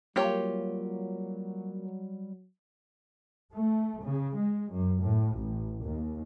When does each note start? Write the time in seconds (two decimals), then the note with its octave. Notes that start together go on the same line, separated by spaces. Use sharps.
0.16 F#3 G3 A#3 F4 G4 C#5
3.53 A3
4.03 C#3
4.35 G#3
4.71 F#2
5.01 A2
5.34 A1
5.84 D#2